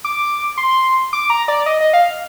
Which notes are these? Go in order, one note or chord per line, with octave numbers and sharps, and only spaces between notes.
D6
C6
D6
A#5
D5
D#5
D#5
F5